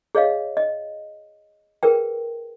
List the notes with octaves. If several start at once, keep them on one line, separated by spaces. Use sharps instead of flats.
G#4 C#5 D#5 F5
D#5
G#4 A#4 B4 G5